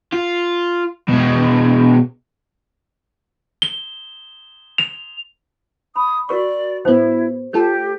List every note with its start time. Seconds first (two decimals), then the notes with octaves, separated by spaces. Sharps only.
0.13 F4
1.08 B2 G#3
3.62 G7
4.78 F7
5.96 B5 D#6
6.29 F#4 A#4 D5 C#6
6.85 A2 B3 E4 C5
7.53 A3 F4 G4 A4